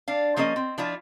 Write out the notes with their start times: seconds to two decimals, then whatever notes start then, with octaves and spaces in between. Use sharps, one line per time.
0.08 D4 F5
0.37 F3 A#3 C#4 G#4 D#5
0.56 C4
0.78 F3 D4 E4 F4